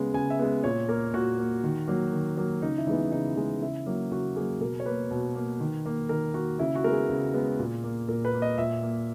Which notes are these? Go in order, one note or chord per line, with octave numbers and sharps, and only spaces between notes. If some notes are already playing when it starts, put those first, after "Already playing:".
Already playing: C#3 G#3 B3
C#3 G#5
E5
G#3 B3
A#2 C#5
A#3 A#4
A#2 F#4
A#3
D#3
F#3 A#3
D#3
F#3 A#3
C#3 D#4
E4
E3 G#3 B3 D#4
C#3 D#4
E3 G#3 B3
C#3 E4
F#3 A#3
C#3 F#4
F#3 A#3 G#4
B2 A#4
C#5
A#3 B4
B2
A#3
D#3
A#3
D#3 A#4
A#3 F#4
C#3 E4
F#4
G#3 B3 A#4
G#4
C#3
G#3 B3
A#2
A#3
A#2 A#4
B4
A#3
D#5
A#2 E5
A#3